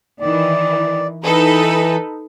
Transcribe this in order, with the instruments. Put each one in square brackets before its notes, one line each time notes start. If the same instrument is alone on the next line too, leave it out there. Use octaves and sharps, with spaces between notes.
[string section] D#3 E3 [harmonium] D5
[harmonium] E3 [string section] D#4 A4 B4